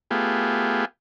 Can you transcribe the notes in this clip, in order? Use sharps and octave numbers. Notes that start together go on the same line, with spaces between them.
A3 B3 F4 G4 G#4